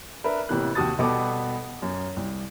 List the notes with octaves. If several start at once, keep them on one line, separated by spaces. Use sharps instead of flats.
D4 A#4 B4 E5
A1 C3 E3 A#3 B3 F#6
D#2 C3 F#4 A5 D#6 A6
B2 G3 B3 G4 A4 D6
F#2
C2